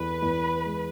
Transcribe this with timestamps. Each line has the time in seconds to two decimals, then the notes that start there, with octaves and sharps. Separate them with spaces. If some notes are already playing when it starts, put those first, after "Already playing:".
Already playing: E2 A3 B4
0.22 E2
0.65 G#3